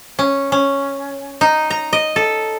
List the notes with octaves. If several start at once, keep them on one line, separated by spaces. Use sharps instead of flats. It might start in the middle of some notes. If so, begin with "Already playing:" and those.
C#4
C#4
D#4
A#5
D#5
A4